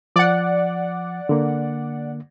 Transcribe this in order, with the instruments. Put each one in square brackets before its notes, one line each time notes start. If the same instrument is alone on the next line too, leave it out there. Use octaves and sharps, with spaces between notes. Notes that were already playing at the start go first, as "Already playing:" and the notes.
[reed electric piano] F3 [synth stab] D5 F#5
[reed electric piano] D3 A#3